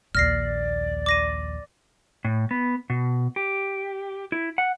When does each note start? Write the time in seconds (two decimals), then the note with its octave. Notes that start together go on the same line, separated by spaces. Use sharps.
0.15 A#1 D#2 D5 F6 A#6 C7
1.06 D6 A#6 D#7
2.25 A2
2.51 B3
2.90 B2
3.36 G4
4.32 E4
4.58 F#5